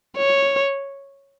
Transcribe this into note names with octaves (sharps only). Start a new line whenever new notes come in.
C#5